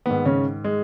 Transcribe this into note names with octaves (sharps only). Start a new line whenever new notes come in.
G#2 D#3 B3
C#3 C#4
G#3